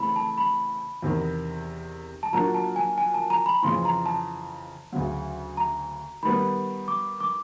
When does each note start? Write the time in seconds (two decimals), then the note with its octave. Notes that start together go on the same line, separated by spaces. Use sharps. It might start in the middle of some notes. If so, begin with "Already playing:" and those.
Already playing: C#3 E3 A3 C4 B5
0.16 A5
0.38 B5
1.03 E2 C3 D#3
2.23 A5
2.32 A#2 F#3 A#3 D4 F#4 A#5
2.54 A5
2.76 G#5
2.98 G#5
3.14 A5
3.30 A#5
3.46 B5
3.63 F2 C#3 E3 C6
3.85 A#5
4.06 A5
4.92 D2 C#3 F#3
5.57 A#5
6.23 D#3 G3 B3 B5
6.88 D6
7.21 D6